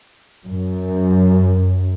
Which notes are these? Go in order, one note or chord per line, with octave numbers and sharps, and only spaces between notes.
F#2